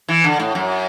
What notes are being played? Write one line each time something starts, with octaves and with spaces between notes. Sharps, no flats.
E3
D3
A2
F#2